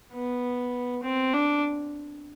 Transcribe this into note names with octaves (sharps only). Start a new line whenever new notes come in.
B3
C4
D4